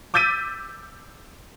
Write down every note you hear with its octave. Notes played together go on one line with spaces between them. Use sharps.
D6 E6 G6 A6 B6 D#7